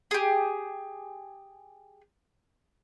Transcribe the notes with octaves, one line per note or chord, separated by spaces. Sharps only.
G4 G#4